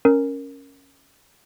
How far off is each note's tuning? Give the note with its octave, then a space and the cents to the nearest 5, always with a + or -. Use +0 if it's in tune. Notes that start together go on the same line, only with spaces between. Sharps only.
C#4 +0 A#4 +0